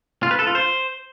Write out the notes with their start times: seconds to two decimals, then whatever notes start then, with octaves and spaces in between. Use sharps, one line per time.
0.23 F4
0.31 B4
0.39 A4
0.47 F4
0.55 C5